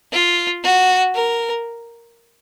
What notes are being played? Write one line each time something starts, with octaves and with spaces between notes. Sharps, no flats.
F4
F#4
A#4